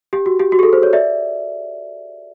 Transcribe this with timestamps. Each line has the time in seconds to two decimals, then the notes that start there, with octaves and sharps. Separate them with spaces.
0.13 G4
0.26 F#4
0.39 G4
0.52 F#4
0.59 G#4
0.63 A4
0.73 C5
0.83 C#5
0.93 D5 E5